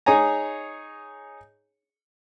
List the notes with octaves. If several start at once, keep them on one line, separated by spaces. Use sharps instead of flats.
D#4 G#4 C#5 G#5 A#5